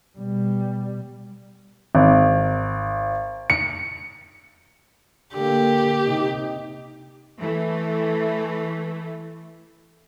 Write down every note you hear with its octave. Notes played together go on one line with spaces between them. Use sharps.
B2 G3
G#1
C#7
D3 A#3 G4
C3 D#4
E3 A3